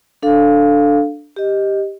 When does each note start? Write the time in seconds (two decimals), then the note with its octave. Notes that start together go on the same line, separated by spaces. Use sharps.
0.22 D4 A4 F5
1.36 G4 D#5